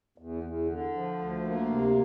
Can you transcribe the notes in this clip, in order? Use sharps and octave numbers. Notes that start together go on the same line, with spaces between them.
E2
E2
D3
F3
D2
A#3
C3